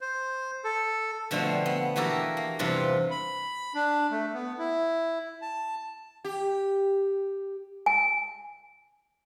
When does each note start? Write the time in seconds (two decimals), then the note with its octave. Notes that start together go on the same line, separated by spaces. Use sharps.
0.01 C5
0.64 A4
1.31 B2 D3 F3 A3 C4
1.66 B3
1.96 E3 A#3 F#4 G4 A4 A#4
2.37 A#3
2.59 E2 G2 C3 F4 B4
3.11 B5
3.75 D4
4.11 A3
4.34 B3
4.59 E4
5.42 A5
6.24 G4
7.86 G#5